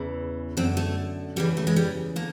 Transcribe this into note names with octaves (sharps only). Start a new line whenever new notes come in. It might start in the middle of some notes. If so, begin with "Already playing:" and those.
Already playing: E2 C#3 E3
F#2 D3 C4
A3
E2 C#3 E3 G3
A3
G#3
G3
D3 A#3